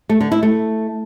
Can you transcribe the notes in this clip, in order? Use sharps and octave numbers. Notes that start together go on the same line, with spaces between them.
A3
D3
E4
A3